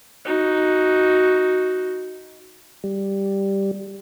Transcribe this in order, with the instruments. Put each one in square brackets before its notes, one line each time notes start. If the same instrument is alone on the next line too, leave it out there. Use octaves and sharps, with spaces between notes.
[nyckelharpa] D#4 F#4
[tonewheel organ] G3